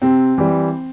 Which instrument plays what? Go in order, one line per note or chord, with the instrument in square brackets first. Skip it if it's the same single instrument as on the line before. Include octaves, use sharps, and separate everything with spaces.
[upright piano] C3 C4
E3 G3